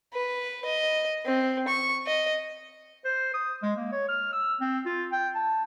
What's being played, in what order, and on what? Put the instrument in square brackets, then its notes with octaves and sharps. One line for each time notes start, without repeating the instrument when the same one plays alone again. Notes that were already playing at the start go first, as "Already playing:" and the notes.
[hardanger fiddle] B4
D#5
C4
C#6
D#5
[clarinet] C5
D#6
G#3
A#3
C#5
F6
E6
C4
F4
G5
A5